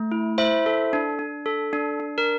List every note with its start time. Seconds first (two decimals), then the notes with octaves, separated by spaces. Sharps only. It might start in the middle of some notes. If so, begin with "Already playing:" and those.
Already playing: A3
0.12 E4
0.38 E4 C5 E5
0.66 A4
0.93 D4
1.19 D4
1.46 A4
1.73 D4
2.00 D4
2.18 A#4